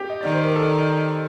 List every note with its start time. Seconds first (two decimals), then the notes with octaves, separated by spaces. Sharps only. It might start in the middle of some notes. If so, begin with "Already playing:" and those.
Already playing: G4
0.10 D#5
0.21 D#3 D5
0.32 C5
0.44 A#4
0.56 A4